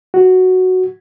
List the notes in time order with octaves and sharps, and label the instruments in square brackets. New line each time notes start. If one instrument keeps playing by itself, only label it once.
[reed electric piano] F#4